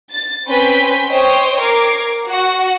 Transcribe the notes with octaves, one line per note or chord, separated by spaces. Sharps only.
A6
C4 C#4 B4 G#5 G6 B6
C5 C#5 D#5 G5
A#4 D6 G#6 C7
F#4 F#5